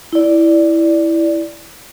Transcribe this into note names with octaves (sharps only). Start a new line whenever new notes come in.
E4 D5